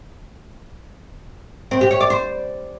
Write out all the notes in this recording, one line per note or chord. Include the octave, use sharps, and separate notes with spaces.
C4
G4
C#5
D5
C5